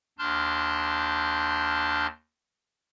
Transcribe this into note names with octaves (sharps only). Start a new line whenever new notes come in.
D#2 D4 A5 C6 F6 G6